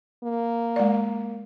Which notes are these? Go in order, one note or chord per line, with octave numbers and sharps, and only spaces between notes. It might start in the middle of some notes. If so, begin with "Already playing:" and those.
A#3
G#3 D5